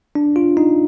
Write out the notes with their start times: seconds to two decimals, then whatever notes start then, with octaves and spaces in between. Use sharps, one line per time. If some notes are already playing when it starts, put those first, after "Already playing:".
0.15 D4
0.36 F4
0.57 D#4